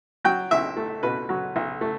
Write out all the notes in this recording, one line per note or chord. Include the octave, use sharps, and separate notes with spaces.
F#3 G5
B1 E5
A3
B2 B4
F#3
B1
A3